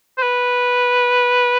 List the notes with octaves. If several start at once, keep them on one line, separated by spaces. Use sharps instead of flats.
C5
B4